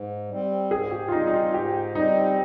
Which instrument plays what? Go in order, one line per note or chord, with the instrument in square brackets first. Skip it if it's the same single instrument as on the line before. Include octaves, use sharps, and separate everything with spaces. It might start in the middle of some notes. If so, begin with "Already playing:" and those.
Already playing: [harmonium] G#2
G3 C4
[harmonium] G#2 [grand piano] G#4
[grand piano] G4
F4
[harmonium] G3 C4 [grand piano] D#4
[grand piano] D#4
F4
[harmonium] G#2 [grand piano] G4
[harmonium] G3 C4 [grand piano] D#4